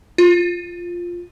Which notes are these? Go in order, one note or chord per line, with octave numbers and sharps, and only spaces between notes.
F4